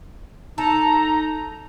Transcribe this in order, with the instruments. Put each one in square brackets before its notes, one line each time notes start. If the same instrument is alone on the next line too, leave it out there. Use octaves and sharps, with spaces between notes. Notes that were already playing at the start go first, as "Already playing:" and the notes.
[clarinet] D#4 [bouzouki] A4 [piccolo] A#5